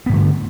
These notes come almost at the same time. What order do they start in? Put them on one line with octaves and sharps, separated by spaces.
B3 G2 D3 A3